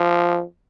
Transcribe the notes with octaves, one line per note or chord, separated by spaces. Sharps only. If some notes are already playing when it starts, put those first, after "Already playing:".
Already playing: F3